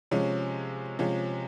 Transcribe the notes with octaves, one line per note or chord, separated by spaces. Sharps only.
C3 F3 G#3 C#4
C3 F3 G#3 C#4